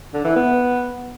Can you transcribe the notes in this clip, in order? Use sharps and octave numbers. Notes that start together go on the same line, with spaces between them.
D3
E3
B3